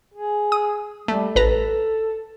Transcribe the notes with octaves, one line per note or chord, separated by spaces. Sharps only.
G#4
D#6
G3 A3
A1 A4 B4 A#5